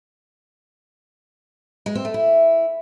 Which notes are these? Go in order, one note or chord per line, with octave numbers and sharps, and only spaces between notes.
G#3
C4
A3
E4